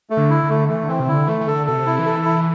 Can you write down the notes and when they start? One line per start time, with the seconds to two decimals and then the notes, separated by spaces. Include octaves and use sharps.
0.10 A3
0.17 D3
0.30 E4
0.44 D3
0.49 A3
0.69 E3 A3
0.83 D3
0.88 E3 C4
1.00 C3
1.08 D3 E4
1.27 E3 A3
1.41 E3
1.47 D3 A4
1.67 B2 A4
1.73 C3
1.86 E4
1.99 E3
2.06 A4
2.25 E4